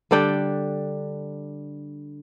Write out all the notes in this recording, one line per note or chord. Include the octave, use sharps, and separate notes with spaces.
D3 G3 D4 G5